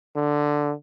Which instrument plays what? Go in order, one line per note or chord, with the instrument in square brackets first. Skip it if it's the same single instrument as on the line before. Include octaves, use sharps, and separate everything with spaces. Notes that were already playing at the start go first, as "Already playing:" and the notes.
[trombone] D3